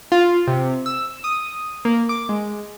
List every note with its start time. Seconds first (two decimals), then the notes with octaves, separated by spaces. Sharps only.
0.12 F4
0.47 C3
0.86 E6
1.24 D#6
1.85 A#3
2.09 D6
2.29 G#3